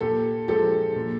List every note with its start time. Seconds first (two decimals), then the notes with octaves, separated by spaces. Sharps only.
0.01 A#2 G4 A4
0.48 F3 G#3 G4 A4
0.96 A#2